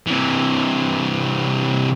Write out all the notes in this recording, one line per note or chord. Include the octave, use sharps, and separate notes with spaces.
C3 E3